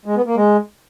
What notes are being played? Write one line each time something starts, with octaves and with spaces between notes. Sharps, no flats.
G#3
B3
A#3
G#3